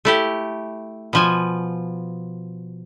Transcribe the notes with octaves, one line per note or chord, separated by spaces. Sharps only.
A3 E4 G4
B2 F3 G#5